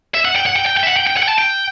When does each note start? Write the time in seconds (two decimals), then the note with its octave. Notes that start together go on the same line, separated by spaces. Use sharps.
0.15 E5
0.25 F#5
0.36 G5
0.46 F#5
0.56 G5
0.66 G5
0.77 G5
0.83 E5
0.86 F#5
0.96 G5
1.07 G5
1.17 F#5
1.23 G5
1.28 A5
1.38 G5